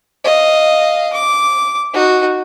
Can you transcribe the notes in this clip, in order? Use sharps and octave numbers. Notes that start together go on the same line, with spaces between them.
D#5 F5
D6
D#4 F#4